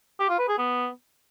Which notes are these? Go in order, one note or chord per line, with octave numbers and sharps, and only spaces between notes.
G4
F4
B4
G#4
B3